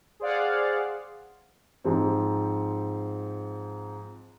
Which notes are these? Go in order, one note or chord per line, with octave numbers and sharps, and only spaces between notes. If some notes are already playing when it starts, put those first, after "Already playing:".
G#4 C5 D5 F5 F#5
G#2 F3 C4